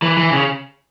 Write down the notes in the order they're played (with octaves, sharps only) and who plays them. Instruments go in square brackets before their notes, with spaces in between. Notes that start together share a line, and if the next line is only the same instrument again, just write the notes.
[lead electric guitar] E3
E3
C#3